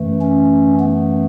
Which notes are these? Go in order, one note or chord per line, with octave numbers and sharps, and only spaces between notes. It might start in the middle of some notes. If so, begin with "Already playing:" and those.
Already playing: F#2 E3 A3
C#4
B3